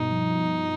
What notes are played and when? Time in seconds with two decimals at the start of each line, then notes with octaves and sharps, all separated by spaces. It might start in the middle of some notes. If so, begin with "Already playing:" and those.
Already playing: G2 B2 D#4
0.11 F3